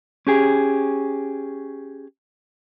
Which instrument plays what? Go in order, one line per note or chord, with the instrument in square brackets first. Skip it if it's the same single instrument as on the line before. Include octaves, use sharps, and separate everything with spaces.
[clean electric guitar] C#4 G4 G#4